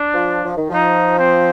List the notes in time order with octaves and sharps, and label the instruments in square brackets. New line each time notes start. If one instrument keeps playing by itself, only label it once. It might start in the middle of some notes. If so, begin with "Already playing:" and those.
Already playing: [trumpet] D4
[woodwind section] F3
F3
D#3
[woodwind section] F3 [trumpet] D#4
[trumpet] C4